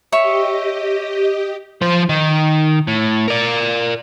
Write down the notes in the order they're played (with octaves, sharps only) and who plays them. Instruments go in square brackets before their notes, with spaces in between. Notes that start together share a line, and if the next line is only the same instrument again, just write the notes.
[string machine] G4 D#5 [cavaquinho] C#5 E5 C#6
[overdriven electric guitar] F3 C5
D#3
A2
A#4 D5